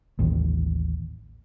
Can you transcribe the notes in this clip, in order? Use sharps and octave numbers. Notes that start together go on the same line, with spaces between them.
A1 D#2